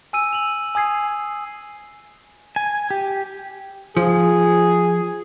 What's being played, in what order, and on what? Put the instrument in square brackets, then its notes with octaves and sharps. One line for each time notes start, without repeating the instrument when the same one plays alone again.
[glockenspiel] G#5 E6 D#7
F7 F#7
G#5 D#6 G#6 C7
[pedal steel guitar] G#5
G4
[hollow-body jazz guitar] F3 [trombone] G#4